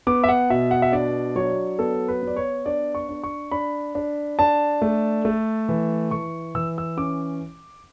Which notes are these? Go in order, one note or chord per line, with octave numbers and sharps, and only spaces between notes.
B3 D6
E5
F#5
B2 E5
F#5
E5
D4 D5
F#3 C#5
B3 A4
B4
B3
D5
C#5
D4 D5
C#6
D4
C#6
D4 B5
D4
D4 A5
A3
A3
E3
E3 C#6
E3 E6
E6
C#4 D6